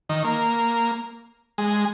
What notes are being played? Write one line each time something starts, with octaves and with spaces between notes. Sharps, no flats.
D#3
A#3
G#3